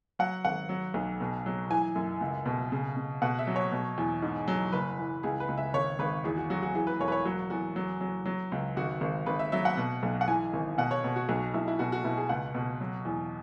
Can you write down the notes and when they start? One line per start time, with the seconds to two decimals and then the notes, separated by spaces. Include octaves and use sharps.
0.19 F#3 F#5
0.45 G#1 F#5
0.69 F#3
0.94 B1
1.20 B2
1.46 F#3
1.70 E3 G#5
1.95 F#2
2.21 C#2
2.46 B2
2.72 C#3
2.97 C#3
3.22 B2 F#5
3.39 E5
3.47 F#3
3.56 C#5
3.72 B2
3.98 E2
4.22 G#2
4.48 F#3
4.73 F#1 B4
4.99 E3
5.23 C#2 G#4
5.40 B4
5.48 C#2
5.57 E5
5.74 G#1 C#5
5.99 G#1 B4
6.24 E2 G#4
6.38 F#4
6.50 F#3 F#4
6.62 F#4
6.75 E3 G#4
6.87 B4
6.99 E1 C#5
7.08 B4
7.12 C#5
7.25 F#3 F#4
7.50 E2 F#4
7.76 F#3
8.01 F#3
8.26 F#3
8.52 C#2
8.76 G#1 F#4
9.01 G#1
9.26 G#1 B4
9.39 E5
9.52 F#3 E5
9.65 F#5
9.77 B2
10.03 B1
10.21 F#5
10.28 E3 G#5
10.53 G#1
10.78 B2 F#5
10.91 C#5
11.04 B2
11.16 F#4
11.29 B1 F#4
11.54 B1 E4
11.68 E4
11.79 B2 F#4
11.92 F#4
12.04 B2 E4
12.17 G#4
12.29 C#2 F#5
12.54 B2
12.80 F#3
13.05 E2